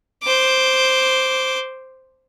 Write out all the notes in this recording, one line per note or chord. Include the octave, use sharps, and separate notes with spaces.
C5 D6